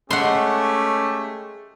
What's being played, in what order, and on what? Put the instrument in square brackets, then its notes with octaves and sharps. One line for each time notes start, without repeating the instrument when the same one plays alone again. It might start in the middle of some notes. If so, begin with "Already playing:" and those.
[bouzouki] G#3 [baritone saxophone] A3 [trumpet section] C#4 G4 [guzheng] F#5 C6